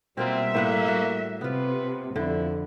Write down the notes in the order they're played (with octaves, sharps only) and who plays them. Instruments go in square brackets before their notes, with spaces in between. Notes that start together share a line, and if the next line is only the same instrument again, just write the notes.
[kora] B2 A#3 F4 [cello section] G3 E5 [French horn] C4
[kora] A2 B4 F#5 [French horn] A#3
[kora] F#4
[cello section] C3 [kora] B3 F4 [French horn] B4
[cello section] F2 [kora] D3 [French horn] E4